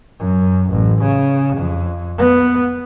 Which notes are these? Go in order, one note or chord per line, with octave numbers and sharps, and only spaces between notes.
F#2
A1
C#3
F2
B3